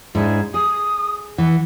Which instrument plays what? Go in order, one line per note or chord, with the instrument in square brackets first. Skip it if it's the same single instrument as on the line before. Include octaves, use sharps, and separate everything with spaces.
[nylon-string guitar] G#2 D4 E4 [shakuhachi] G#4
[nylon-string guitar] G#4 [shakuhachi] D#6
[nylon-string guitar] E3 [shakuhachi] F#5